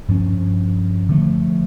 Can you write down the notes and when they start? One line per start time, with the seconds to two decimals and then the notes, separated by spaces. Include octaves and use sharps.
0.09 G2 F3 C#4
1.09 D3 F3 A3